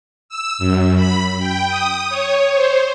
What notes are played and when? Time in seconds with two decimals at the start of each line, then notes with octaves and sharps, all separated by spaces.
0.29 E6
0.58 F#2
0.95 B5
1.39 G5
1.68 D#6
2.09 C#5
2.54 C5